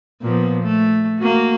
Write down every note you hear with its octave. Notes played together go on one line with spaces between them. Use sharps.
A#2 F3 B3
A3
A#3 F#4